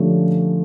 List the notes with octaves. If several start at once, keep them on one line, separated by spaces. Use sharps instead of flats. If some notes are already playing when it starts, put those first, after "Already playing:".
Already playing: D3 F3 A3 C#4 G4